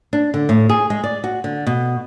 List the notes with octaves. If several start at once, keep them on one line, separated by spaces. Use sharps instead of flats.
D4
D3
A2
G#4
G#3
D5
F#4
D3
B2